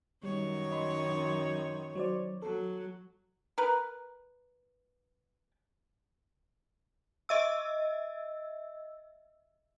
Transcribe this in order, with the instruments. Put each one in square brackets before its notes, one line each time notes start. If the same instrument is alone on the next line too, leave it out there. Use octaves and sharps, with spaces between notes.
[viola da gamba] F#2 D#3 C#5 [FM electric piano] G3
[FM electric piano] D#5 B5 C6
F#3 C5 D5
[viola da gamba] F#3 [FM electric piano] A4
[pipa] A#4 B4
[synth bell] D#5 E5 E6